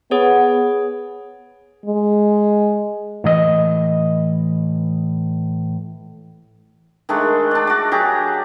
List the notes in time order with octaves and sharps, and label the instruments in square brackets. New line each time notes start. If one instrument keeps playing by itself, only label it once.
[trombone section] B3 [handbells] G#4 C#5
[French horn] G#3
[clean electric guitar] A2 E3 D#5
[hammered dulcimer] D#3 G#3 A3 D4
D4 D5
F#4 D6
F#3 G4 G#4 A#5